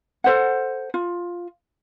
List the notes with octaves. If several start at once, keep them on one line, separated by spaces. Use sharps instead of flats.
A4 C5 F#5
F4